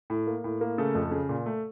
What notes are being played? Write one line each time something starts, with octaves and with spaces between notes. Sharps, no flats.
A2
A#3
A2
A#3
C#3 A3 A4
F2
C#3
A#2
A3